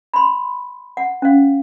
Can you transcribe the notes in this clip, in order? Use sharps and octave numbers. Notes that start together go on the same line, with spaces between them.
B5 C6
F#5
C#4 F5